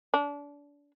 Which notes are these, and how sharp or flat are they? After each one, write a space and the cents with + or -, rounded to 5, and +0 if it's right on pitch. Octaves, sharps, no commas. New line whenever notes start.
D4 -30